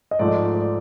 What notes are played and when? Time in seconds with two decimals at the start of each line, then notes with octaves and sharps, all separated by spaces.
0.11 D#5
0.19 G#2 F3 A3 D5
0.55 D5